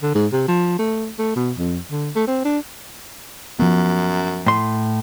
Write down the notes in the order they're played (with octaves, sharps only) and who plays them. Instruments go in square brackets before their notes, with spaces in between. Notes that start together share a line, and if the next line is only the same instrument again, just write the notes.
[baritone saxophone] D3
G#2
C3
F3
A3
A3
B2
F2
D3
A3
C4
D4
[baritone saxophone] F#2 [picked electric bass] F3 B3
[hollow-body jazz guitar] A2 C6